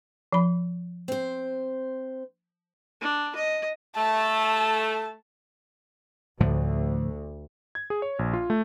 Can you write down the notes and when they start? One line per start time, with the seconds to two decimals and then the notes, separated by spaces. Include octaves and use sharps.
0.32 F3 B5
1.08 C4 C5
3.01 D4
3.36 D#5
3.96 A3 A5
6.41 D2 A2 D3 F3
7.75 G#6
7.90 G#4
8.02 C#5
8.19 A#1
8.33 F4
8.50 A3